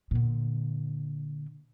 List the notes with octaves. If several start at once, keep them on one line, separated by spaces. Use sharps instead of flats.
A#2 D3